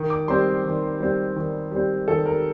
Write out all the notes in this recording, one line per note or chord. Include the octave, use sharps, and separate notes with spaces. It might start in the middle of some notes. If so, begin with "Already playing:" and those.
Already playing: D#3
D6
G3 C4 C6
D#3
G3 C4
D#3
G3 C4
D#3 A4
A#4